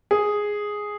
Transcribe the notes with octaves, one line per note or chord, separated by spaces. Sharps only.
G#4